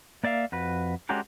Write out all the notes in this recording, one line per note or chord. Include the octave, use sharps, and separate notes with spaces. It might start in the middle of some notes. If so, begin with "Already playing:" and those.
A#3 D5 E5 F5
F2 F#4 B4
G#3 C#4 D4 F#4 G4 A#4